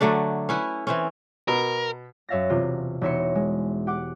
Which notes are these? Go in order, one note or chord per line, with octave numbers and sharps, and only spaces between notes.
D3 F#3 A3 D4
C#4 E4 B4
E3 C4 C#4
B2 A#4
F#2 C#5 E5 F5 A6 A#6
E1 C3 F4
E1 D#4 C#5 E5 C6 C#7
G#3
G4 F#5 D6